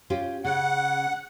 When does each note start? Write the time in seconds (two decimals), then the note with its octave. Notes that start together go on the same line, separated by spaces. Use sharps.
0.10 C#4 F4 G4
0.45 C#3 F#5